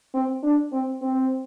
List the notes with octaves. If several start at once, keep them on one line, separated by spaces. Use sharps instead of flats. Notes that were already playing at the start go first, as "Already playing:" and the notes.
C4
D4
C4
C4